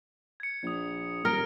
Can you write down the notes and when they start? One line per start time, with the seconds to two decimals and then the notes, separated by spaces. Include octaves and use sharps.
0.40 G#6 C#7
0.63 A#1 D#6 G#6
1.25 D#1 A#4 F6 A#6 D7